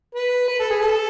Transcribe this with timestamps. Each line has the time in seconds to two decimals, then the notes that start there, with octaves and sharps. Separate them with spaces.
0.15 B4
0.48 B4
0.59 A4
0.70 G#4
0.81 A4